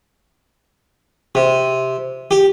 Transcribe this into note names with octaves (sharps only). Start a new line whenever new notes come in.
C3
G4